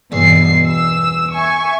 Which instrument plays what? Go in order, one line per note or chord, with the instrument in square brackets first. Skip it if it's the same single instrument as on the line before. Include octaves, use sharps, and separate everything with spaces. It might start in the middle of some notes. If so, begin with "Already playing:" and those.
[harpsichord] E2 [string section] G2 B2 C7
[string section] E6
E5 G#5 C#6